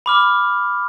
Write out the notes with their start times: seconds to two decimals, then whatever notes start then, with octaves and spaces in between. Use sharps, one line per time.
0.06 B5 D6 F6